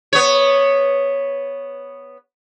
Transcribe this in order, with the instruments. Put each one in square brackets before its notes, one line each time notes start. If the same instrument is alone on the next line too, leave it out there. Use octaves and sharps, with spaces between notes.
[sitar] B3 C#5